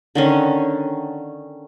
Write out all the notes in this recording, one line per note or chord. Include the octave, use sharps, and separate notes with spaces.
D3 D#3 C#4